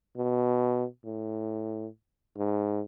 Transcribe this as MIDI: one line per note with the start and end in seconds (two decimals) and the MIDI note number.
0.17 0.85 47
1.05 1.86 45
2.38 2.82 44